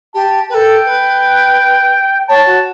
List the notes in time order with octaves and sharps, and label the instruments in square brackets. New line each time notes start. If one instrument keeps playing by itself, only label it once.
[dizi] G4 [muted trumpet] A5
[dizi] A4 B4 [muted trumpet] G5
[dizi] B4
[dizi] C#5 [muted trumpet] A5
[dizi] F#4